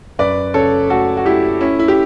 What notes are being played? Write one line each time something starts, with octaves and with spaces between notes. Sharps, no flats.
F#2 B4 D5
C#3 A4 C#5
A3 F#4 A4
F#4
A3 E4 G4
C#4 E4
E4
G4